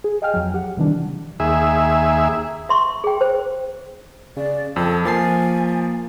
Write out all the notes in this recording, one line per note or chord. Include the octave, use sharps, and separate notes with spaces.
G#4
D#5 F5 G5 G#5 F6
F2 F#3
G4 F#5
C3 D#3 E3 G3 D4
D#2 G#4 E5
E5 C6 C#6
G#4 G5
C5
C#3 D5
F2 A4 E6
F3 A#3 G#5 A6 C7